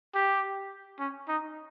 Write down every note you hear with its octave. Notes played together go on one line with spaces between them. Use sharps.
G4
C#4
D#4